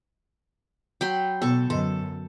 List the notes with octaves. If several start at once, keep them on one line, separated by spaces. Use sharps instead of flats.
F#3 G5 B5 C6
B2 B3 A4 C#6
F#2 D3 A4 D#5